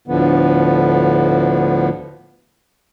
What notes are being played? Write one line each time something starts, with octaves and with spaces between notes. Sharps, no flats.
D2 A2 D3 F3 B3